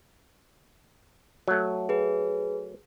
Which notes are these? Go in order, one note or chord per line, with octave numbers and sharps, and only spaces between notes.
F#3 A3
G#4 B4